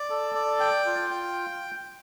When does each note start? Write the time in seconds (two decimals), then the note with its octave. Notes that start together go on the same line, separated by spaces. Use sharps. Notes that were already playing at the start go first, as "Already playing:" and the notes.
Already playing: D5
0.10 A4
0.35 D5
0.60 G5
0.86 F4
1.11 G5